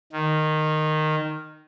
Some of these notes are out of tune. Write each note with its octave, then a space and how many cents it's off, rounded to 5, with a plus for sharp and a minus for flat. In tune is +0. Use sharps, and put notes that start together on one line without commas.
D#3 -10